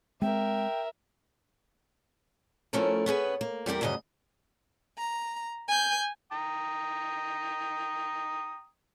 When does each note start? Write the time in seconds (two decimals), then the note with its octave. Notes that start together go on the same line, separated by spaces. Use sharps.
0.22 G#3 C4 A#4 E5 G5
2.73 F3 A3 C#4 E4 A4 A#4
3.06 B3 C#4 G#4 B4
3.41 A#3
3.66 E2 G3 F4 G4 A#4
3.81 D2 G2 C#3 F#3 D#5
4.98 A#5
5.68 G#5 G6
6.32 G5 A#5 D#6